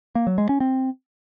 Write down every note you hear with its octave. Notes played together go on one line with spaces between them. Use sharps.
A#3
F#3
G#3
C#4
C4